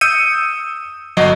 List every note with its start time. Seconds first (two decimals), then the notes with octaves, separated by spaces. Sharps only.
0.01 D#6 E6 G6 C#7 D#7
1.17 G1 F#3 D#5